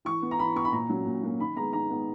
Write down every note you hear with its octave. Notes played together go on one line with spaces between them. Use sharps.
E3 C#6
B3
A#5
E3 B5
B3 C#6
B5
A#2 A#5
F#3 A#3 C#4
A#2
F#3 A#3 C#4
D#3 B5
G#3 B3 A#5
D#3 A#5
G#3 B3